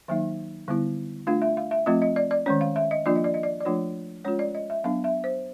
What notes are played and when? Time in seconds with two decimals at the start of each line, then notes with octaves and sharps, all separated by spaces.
0.08 D#3 F#3 A#3 D#4 E5
0.68 D3 G3 B3 E4
1.27 A3 D4 F4 F5
1.42 E5
1.57 F5
1.71 E5
1.86 F3 A3 C4 F4 D#5
2.02 D#5
2.16 D5
2.31 D5
2.46 D#3 G#3 C#4 C#5
2.61 F5
2.76 E5
2.91 D#5
3.06 F3 A#3 D4 F4 D5
3.16 D#5
3.24 D5
3.34 D#5
3.43 D5
3.60 D5
3.65 F3 A3 D4 F4 C#5
4.24 G#3 C#4 F4 C#5
4.39 D5
4.55 D#5
4.70 E5
4.84 F#3 B3 D4 F5
5.04 E5
5.24 C5